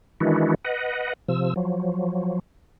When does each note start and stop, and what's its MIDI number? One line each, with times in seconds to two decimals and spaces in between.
0.20 0.54 51
0.20 0.54 52
0.20 0.54 56
0.20 0.54 62
0.20 0.54 64
0.20 0.54 66
0.65 1.13 71
0.65 1.13 75
0.65 1.13 78
1.28 1.54 48
1.28 1.54 53
1.28 1.54 88
1.56 2.39 53
1.56 2.39 54